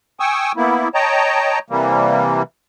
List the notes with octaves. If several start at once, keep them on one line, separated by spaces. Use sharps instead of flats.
G5 G#5 C#6 D#6 E6
A#3 B3 E4
C#5 D#5 G5 A5 A#5
C3 E3 G3 A#3